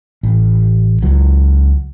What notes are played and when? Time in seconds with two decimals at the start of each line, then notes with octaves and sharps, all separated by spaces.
0.23 A1
1.03 C#2 F#3